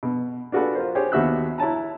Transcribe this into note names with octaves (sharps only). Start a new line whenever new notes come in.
B2
D4 F4 F#4 G#4 A4 B4
F4 A#4 C5
G4 G#4 C5 C#5
D#2 B3 F#4 E5 E6 F#6
E4 C#5 A5 A#5